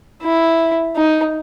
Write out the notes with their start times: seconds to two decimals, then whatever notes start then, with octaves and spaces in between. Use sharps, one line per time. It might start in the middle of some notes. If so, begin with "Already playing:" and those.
0.23 E4
0.96 D#4